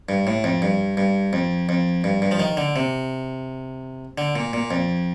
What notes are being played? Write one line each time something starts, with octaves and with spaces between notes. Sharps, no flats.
G2
A2
F2
G2
G2
F2
F2
G2
G2
F3
D#3
D3
C3
D3
A#2
A#2
F2